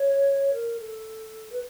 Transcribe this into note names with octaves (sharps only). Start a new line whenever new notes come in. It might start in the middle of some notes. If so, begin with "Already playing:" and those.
Already playing: C#5
A#4
A4
B4